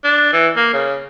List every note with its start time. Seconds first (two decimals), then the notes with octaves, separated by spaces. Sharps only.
0.04 D4
0.33 E3
0.56 A#3
0.73 C#3